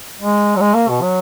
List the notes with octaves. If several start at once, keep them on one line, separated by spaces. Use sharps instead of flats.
G#3
F#3
G#3
A#3
B2
F#3